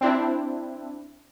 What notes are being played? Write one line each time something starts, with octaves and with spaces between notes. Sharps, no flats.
C4 D4 E4